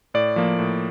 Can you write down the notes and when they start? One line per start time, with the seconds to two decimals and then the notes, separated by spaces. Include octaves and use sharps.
0.14 A2 D5
0.36 F3 A#3
0.59 A2